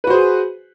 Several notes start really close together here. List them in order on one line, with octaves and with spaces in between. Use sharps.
B4 F#4 C5 G#4